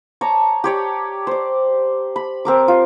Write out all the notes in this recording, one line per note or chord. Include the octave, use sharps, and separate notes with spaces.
C#5 D5 A5 A#5
G4 C#5 D5
C5 D5
B5
C4 A#4 D6
F4